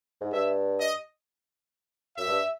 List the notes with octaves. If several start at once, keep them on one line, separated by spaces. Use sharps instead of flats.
G#2
G2 E5
D#5
F#2 E5
G2